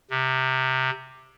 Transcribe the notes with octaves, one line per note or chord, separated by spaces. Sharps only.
C3